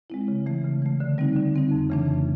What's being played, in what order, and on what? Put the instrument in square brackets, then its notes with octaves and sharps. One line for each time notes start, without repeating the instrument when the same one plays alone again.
[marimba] G#3 C4 E4
C#3
E3 A3
C#3
E3 A3
D3
G3 C4 D#4
D3
G3 C4 D#4
F2
C#3 E3 A3 D4
F2